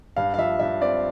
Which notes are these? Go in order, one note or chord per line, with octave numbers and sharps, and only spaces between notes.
G2 F5
F5
F3 E5
G2 E5
C4 D5